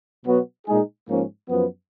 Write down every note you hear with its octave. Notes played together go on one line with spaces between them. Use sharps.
B2 F#3 B3 F#4
A#2 G#3 D#4 G#4
G#2 F3 A#3 C#4
F#2 F3 B3